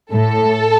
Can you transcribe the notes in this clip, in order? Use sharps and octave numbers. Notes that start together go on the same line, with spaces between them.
A2 A4